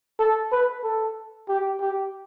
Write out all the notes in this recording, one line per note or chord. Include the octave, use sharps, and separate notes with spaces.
A4
B4
A4
G4
G4